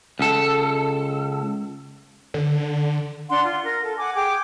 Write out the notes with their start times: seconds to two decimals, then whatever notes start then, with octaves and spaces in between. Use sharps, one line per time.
0.19 C#2 A4
2.34 D3
3.30 D4 F#5 C6
3.43 F4
3.64 A#4
3.83 A4
3.98 F#5 G#5 D6
4.15 G#4 G5 D6